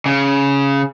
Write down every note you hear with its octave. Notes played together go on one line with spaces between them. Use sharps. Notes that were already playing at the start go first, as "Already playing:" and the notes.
C#3